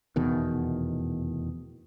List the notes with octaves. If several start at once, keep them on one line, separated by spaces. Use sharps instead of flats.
F1 E2 B2 D#3